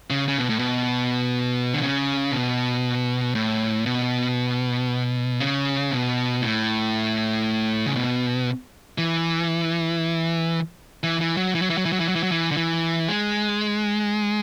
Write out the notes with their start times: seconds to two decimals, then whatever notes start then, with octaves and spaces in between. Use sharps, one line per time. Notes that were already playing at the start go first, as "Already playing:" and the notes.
0.10 C#3
0.28 C#3
0.38 B2
0.49 A2
0.59 B2
1.74 D3
1.82 C#3
2.32 B2
3.35 A2
3.86 B2
5.40 C#3
5.92 B2
6.42 A2
7.86 C#3
7.96 B2
8.98 E3
11.03 E3
11.21 E3
11.37 F#3
11.55 E3
11.62 F#3
11.70 E3
11.77 F#3
11.85 E3
11.92 F#3
12.00 E3
12.08 F#3
12.15 E3
12.23 F#3
12.32 E3
12.51 D3
12.57 E3
13.08 G#3